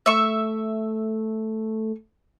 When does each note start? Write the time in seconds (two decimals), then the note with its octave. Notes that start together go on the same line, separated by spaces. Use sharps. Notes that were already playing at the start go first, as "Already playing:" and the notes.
0.06 A3 E5 C#6